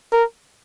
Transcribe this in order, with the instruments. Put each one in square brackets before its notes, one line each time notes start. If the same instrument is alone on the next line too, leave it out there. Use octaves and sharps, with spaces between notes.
[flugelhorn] A#4